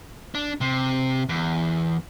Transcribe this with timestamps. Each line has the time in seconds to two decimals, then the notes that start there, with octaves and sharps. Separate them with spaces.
0.35 D4
0.61 C3
1.29 E2